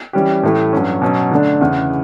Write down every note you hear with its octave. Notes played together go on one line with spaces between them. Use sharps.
E3 G3 C#4 G4
A2 E3 A3 E4 G4
G2 F#3 C#4
B2 F#3 C#4
D3 A3 D4
E2 C#3 E3